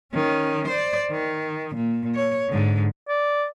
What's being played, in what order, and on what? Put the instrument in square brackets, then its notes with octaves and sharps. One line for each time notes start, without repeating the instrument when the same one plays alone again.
[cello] D#3 C#4
C5 D5
D#3
A#2
C#5
G#2 D3
[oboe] D5